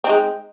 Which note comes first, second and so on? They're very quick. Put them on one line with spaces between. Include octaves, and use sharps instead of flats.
C4 D#4 G#3